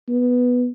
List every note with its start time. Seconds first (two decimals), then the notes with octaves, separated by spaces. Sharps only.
0.09 B3